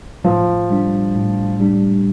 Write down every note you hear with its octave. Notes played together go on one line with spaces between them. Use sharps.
A2 F3
G3 D4
A2
G3 D4